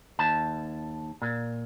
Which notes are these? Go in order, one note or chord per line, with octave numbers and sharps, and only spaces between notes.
D#2 A5
A#2